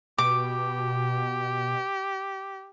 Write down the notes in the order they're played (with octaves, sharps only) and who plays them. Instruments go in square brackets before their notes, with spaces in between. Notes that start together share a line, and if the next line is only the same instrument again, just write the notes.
[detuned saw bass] B2 [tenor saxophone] G4 [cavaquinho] D6